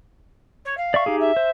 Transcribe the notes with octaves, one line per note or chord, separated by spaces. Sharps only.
C#5
F5
D5 E5 C#6
D#4 G4 G#4
E5
C5